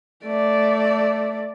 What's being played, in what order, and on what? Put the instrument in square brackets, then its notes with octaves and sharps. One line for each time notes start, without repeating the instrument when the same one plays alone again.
[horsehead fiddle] A3 D5